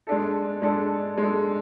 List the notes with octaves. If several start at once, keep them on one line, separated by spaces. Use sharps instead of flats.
G#3 D4 A4
G#3 D4 A4
G#3 D4 A4